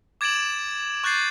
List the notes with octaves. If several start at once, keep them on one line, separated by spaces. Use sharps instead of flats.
D6 G#6 A6 D7 E7 F#7
C#6 F#6 G6 A6 C7